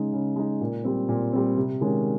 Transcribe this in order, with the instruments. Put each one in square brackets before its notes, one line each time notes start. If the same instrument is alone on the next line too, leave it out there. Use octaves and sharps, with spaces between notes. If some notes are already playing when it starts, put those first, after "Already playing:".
Already playing: [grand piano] C#3 G#3 D#4
C#3
G#3 D#4
A#2
G3 C4
A#2
G3 C4
C3
D#3 G#3 C#4